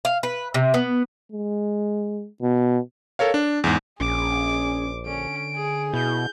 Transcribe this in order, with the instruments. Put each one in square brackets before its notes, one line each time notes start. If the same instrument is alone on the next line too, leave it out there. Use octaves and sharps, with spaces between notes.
[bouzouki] F5
B4
C3
B3
[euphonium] G#3
B2
[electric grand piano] A4 A#4 C#5 F5
D4
E2 G#2
[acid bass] A#1 [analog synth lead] C#4 [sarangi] G#4 [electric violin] D6
[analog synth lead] D3 [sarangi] C#4 [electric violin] D7
[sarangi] G#4
[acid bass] B2 [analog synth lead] E4 [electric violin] G6